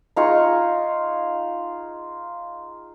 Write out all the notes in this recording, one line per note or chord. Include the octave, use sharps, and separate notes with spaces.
D#4 F4 G#4 C#6